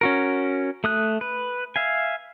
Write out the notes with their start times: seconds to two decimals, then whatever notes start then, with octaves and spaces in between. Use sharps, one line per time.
0.01 C#4 F#4 A#4
0.84 A3 D#6 F#6
1.21 B4
1.76 E5 F5 G#5